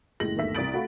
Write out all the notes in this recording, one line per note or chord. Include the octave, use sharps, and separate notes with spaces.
F#1 A2 G#3 A#6 F#7
G1 D#2 A3 E5 B6
C2 D5 D#6 A6 D7 F#7
A3 F#4 F5 B5